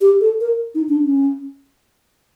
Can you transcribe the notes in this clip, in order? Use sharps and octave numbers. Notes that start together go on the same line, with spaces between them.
G4
A4
A#4
D#4
D4
C#4